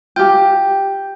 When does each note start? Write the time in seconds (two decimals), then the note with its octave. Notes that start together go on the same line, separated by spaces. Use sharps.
0.16 F4 G4 G5 G6